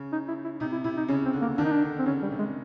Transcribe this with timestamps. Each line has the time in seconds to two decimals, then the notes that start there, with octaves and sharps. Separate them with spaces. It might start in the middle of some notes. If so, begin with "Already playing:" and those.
Already playing: C#3
0.12 D#4
0.28 E4
0.44 E4
0.60 C3 D#4
0.72 E4
0.84 C3 E4
0.97 D#4
1.09 C#3 C#4
1.25 C4
1.33 D3
1.41 A#3
1.58 D#3 D4
1.65 D#4
1.72 D4
1.82 D3
1.99 C4
2.06 C#3 C#4
2.22 G3
2.31 C3
2.38 G#3